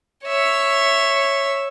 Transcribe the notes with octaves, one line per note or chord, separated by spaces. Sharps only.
C#5 E5